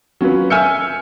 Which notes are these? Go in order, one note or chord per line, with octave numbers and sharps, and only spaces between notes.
F#3 C#4 F4 B4
E5 G#5 E6 F6 G6 C#7